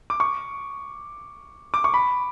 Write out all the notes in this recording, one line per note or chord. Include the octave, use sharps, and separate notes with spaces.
D6
C#6
D6
C#6
B5